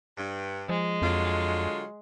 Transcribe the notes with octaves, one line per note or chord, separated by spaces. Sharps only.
G2
F3 G#3
F2 D3 F#3 F4